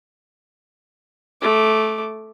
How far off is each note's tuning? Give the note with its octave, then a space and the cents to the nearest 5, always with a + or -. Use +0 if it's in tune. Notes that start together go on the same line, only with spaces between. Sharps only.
A3 -10 D6 +0